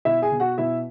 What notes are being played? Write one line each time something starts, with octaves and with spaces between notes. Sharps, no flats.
B2 E4 E5
G#4 G#5
B2
F#4 F#5
B2 E4 E5